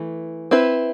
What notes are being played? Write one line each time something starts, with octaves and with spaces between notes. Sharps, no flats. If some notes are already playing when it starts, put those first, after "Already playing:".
Already playing: E3 A3
C4 E4 B4